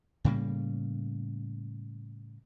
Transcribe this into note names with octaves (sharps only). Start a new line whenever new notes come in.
A2 C#3 G3 A#3